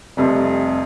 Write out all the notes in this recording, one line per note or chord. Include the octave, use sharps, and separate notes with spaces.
F1 F2 C3 G3